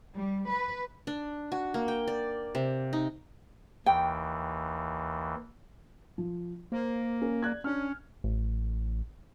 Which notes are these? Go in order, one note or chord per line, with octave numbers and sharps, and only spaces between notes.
G3
B4
D4
F#4
A#3
G5
D5
C3
D#4
D#2 E3 G5
F3
A#3 C5
C#4 A#4
D5 F#6 G#6
C#4 D4 F6
A1